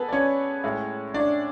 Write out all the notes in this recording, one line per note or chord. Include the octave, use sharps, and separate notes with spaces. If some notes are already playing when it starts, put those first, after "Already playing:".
Already playing: B3 G#4 A4 B4 A5
D5
C#4 C#5
A2 G#3
D4 D5